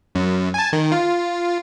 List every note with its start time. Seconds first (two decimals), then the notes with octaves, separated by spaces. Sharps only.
0.15 F#2
0.54 G#5 A5
0.73 D#3
0.92 F4